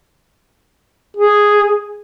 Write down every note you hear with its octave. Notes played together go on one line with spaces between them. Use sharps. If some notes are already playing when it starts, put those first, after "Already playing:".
G#4